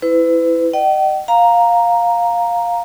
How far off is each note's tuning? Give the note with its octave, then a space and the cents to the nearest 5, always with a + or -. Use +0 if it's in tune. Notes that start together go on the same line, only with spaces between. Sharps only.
E4 +0 B4 +35
D#5 -35 G5 -45
F5 +10 A#5 +0